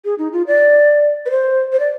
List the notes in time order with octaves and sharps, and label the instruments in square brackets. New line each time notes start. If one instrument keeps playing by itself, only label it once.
[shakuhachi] G#4
D#4
F4
D5
B4
C5
C5
D5